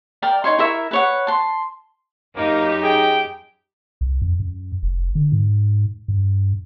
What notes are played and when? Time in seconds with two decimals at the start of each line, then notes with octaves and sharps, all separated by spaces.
0.22 A#4 D5 G5
0.44 D#4 F4 C#5 C6
0.58 E4 A#4 E5 C#6
0.91 B4 C#5 F#5
1.27 A5 C6
2.36 F#2 A#3 D#4 G4
2.83 G#4 G5
4.01 C2
4.22 F2
4.40 F#2
4.83 F1
5.15 D3
5.32 G#2
6.08 G2